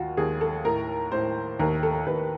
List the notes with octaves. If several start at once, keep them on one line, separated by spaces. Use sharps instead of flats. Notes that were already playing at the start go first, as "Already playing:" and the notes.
Already playing: D#2 F4 F#4
D#2 G#4
A4
A2 A#4
A2 C5
D#2 A#4
A4
D#2 B4